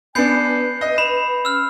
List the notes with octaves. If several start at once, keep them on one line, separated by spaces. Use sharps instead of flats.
B3 D4 G#5 G6 C7 C#7
B4
D#5
B5 E7 F7
C#4 E6 F6